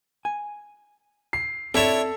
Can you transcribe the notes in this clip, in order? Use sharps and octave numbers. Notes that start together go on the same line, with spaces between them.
G#5
C7
C4 D4 E4 A4 C#5 E7